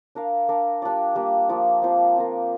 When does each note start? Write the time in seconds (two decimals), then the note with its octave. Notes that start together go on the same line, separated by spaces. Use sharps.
0.15 D4 A#4 F5
0.49 D4 A#4 F5
0.82 G3 D4 F4 D5
1.15 G3 A#3 D4 G4
1.49 F3 A#3 F4 D5
1.82 C4 F4 C5 F5
2.16 C4 F4 A#4